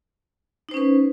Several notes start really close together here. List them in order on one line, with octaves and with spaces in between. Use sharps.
D#4 C5 C#4 B4